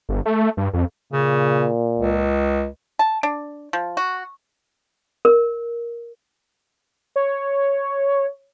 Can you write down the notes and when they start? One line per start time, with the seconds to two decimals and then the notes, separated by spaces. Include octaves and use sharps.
0.09 G1
0.26 A3
0.57 G2
0.73 F2
1.13 A#2 C#3
1.99 C#2
2.99 A5
3.23 D4
3.73 F3
3.97 F#4
5.25 A#4
7.16 C#5